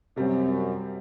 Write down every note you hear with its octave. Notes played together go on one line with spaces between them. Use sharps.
F#2 C3 G3 C4